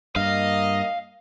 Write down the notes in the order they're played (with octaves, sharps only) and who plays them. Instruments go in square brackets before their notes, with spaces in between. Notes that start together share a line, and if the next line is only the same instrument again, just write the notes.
[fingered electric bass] G2 [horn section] A#3 D#5 [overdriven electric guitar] F5